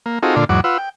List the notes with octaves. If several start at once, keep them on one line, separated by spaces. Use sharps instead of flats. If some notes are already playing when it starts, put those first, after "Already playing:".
A#3
C4 D#4 F4 F#4 G#4 A4
A#2 D3 D4 F4 A4
E2 G#2 F#3 F#5 D6
F4 B4 F#5 E6
G5